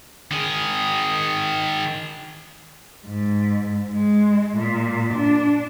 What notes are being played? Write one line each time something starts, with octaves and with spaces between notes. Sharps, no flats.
D#3 G#4
G#2
G#3
A#2
D4